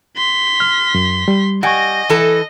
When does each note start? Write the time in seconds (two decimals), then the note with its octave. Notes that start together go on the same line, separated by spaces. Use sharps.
0.17 C6 B6
0.60 F6
0.95 F#2
1.28 G3
1.63 G3 D#5 F#5 G#5 C#6 A#6
2.09 E3 A4